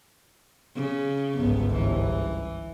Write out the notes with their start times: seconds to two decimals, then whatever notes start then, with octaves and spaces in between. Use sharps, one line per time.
0.76 C#3
1.37 G1 C#2 G#2 B3
1.75 E3